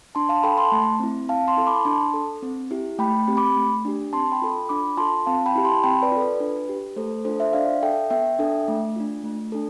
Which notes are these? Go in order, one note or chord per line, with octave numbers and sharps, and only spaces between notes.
D4 A5 C6
F5 A5
A4 G5 B5
A5 C6
A3
C4 E4
C4 F5 A5
A5 C6
E4 A4
B5 D6
D4 A5 C6
A4
C4
E4 G4
A3 G5 B5
C4 G4
B5 D6
A3
D4 G4
C4 A5 C6
G5 B5
F4 A4
D4 B5 D6
F4 A4 A5 C6
C4 F5 A5
G5 B5
E4 G4
A5 C6
C4 G5 B5
B4 D5
F4
A4 B4
D4 B4
G4
A3 A4 C5
D4 F4 A4 C5
C5 E5
D4 D5 F5
A4 E5 G5
B3 E5 G5
D4 A4
A3
D4 F4
A3
D4 A4